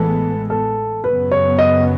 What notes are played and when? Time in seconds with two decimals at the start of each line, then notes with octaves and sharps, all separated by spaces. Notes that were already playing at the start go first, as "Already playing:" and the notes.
Already playing: A1 A2 E3 G#3 B3 A4
0.50 A4
1.04 F#2 C#3 F#3 B3 B4
1.32 C#5
1.58 D#5